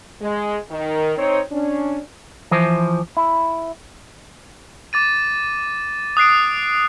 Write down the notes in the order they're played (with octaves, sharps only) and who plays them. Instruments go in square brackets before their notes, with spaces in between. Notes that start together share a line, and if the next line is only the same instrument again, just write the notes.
[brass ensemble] G#3
D#3
C4 D#4 C5 C#5
C#4 D4
[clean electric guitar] E3 F3 C5
E4
[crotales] D6 A6 D#7
D#6 F#6 C7 D7